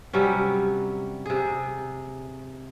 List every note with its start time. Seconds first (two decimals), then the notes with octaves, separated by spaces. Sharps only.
0.13 C3 F#3 G3 C#4
1.26 C3 G#4